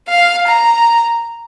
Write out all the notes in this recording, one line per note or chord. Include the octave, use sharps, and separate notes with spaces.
F5
A#5